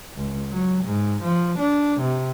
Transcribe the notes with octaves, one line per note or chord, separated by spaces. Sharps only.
C#2
F#3
G#2
F3
D4
C3